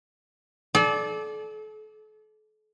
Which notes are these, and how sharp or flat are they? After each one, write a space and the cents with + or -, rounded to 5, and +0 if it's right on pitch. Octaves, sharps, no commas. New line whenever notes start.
A4 -40 D5 +0